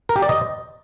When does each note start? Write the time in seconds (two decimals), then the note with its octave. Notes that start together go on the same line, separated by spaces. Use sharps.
0.09 A#4
0.16 G4
0.22 D5
0.29 D#5